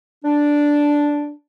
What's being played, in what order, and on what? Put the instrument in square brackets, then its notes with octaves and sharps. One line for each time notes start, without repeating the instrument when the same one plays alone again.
[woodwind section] D4